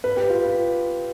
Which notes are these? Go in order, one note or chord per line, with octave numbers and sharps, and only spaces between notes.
B4
G4
F4